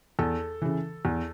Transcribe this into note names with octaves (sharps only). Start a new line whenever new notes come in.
E2 A4
C#3 E3
E2